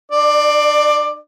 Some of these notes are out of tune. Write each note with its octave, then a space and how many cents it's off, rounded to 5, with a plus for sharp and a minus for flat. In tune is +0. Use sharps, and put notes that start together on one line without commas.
D4 +40 D5 +15